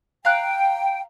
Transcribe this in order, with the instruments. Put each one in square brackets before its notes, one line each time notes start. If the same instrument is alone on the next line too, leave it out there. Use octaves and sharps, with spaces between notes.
[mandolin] F5 A#5 F#6 [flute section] G5